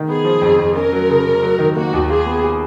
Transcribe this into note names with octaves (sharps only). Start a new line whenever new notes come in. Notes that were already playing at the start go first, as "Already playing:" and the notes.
Already playing: D#3
B3 G#4
F3
F2
F2
C#4 A#4
F#3
C#3
C#3
F#3
D#3
A#3 F#4
D#2
F4 G#4
B3
G#4